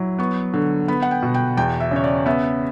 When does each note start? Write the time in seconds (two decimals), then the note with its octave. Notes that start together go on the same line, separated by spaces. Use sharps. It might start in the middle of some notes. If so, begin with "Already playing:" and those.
Already playing: F#3 E4
0.19 B3 C#6
0.54 D3
0.88 B3 B5
1.02 F#5
1.11 G5
1.22 B2
1.34 G5
1.57 E2 G5
1.80 E5
1.91 C#3 C#5
2.04 D5
2.26 B3 E5